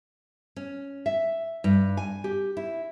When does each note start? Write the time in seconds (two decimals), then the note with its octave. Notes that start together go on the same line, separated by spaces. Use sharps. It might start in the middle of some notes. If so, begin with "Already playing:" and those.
0.56 C#4
1.06 E5
1.64 G2
1.97 G#5
2.24 G4
2.57 E4